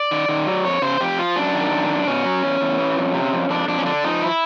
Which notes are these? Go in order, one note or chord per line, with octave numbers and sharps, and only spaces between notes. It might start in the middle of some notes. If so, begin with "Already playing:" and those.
Already playing: D5
D#3
D#3
F#3
F2 C#5
C#3 C5
F2 G4
F3 F4
F#2 D4
D#3
F#2
F#2
B2 C#4
F#3
E2
E2
E3
F2
C3
F2
F2 D4
F2 D4
C#4
D3 D4
F3 D#4
E4